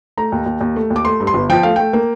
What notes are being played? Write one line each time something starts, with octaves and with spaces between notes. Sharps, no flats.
A3 A#5
D#2
D#2
D#2
A3
D#2
D6
A3 C6
G2
C6
G1
F3 G5
A3 F5
A3 G5
A#3